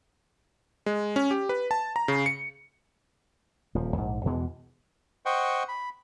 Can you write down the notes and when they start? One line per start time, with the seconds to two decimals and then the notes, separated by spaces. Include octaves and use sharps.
0.86 G#3
1.16 C#4
1.31 G4
1.49 B4
1.71 A5
1.96 A#5
2.08 C#3
2.26 C#7
3.75 D#1 F3
3.97 A#1 G#2
4.25 E2 B2 E3 G#3
5.26 C5 D#5 F#5 G5 C#6
5.68 B5